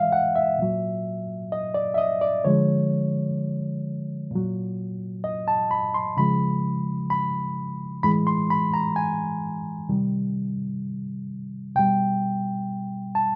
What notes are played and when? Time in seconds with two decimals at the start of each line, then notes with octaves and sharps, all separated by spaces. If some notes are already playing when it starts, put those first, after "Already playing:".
Already playing: A2 E3 G#3 E5 F5
0.12 F#5
0.36 E5
0.58 A#2 F#3
1.52 D#5
1.74 D5
1.94 E5
1.98 D#5
2.21 D5
2.45 D3 F3 G#3 C#5
4.31 A#2 F#3
5.24 D#5
5.48 A5
5.71 B5
5.94 C6
6.17 C#3 F3 G#3 B5
7.10 B5
8.03 A2 E3 G#3 B5
8.27 C6
8.50 B5
8.74 A#5
8.96 G#5
9.89 C3 D#3 G3
11.75 B2 G3 G5
13.15 A5